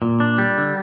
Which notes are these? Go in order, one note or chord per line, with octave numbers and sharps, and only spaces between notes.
A#2
D4
G3
D3